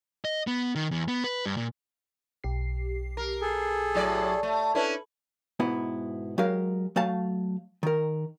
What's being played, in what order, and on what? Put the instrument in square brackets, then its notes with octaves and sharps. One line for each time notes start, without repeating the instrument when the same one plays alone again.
[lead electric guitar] D#5
B3
D#3
E2
B3
B4
G2
A#2
[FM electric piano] B1 G4 C7
[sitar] A#4
[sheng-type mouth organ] G#4 A4
[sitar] A2 F#3 D5
A3
[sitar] C#4 D4 E4 [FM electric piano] A4 B4
[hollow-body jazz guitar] G#2 B2 B3 E4
F#3 G#3 G4 A#4 F5
F#3 A3 F5 A5
D#3 A#4